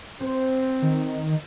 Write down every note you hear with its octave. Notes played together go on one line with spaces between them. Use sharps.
C4 C5
D#3